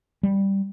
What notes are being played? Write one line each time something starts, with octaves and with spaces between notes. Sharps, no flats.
G3